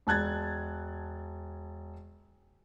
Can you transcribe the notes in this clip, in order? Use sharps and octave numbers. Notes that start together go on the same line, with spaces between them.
E1 A5 F#6 G#6 A6